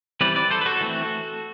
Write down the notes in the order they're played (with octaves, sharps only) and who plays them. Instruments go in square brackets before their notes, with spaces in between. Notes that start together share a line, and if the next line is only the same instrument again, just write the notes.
[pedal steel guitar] E3 G3 C4 B4 D5
B4 D5
A4 C5
B4
F#4 A4
E3 A3 C4